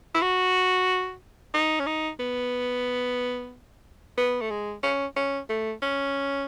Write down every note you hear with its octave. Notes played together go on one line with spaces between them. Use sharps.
E4
F#4
D#4
C#4
D#4
B3
B3
A3
G#3
C#4
C#4
A3
C#4